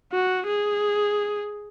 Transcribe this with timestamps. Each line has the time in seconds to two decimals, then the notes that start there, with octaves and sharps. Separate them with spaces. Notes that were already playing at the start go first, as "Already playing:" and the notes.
0.13 F#4
0.47 G#4